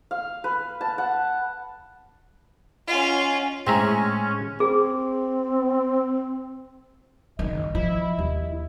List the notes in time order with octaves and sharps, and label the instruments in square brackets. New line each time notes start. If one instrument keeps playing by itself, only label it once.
[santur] F5
B4
A5
F#5
[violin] C#4 F4 [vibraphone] D#5 F#5 G#5
[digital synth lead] A2 [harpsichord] G#3 [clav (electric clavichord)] C4 E5 A#5 [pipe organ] C#4
[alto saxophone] C4 [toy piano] G#4
[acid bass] F#1 [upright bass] D#3 [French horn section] D#5
[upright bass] F3 [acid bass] E4
[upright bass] D#2